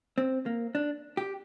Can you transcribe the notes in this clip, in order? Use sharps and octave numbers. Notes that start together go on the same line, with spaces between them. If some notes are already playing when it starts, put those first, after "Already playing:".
C4
A#3
D4
G4